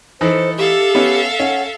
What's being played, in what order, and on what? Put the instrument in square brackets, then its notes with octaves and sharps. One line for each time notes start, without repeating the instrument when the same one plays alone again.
[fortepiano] E3 D#4 [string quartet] A4 [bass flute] C5
[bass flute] G4 [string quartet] A4 E5 F5
[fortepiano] B3 C#4
[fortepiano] C#4 [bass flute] F#5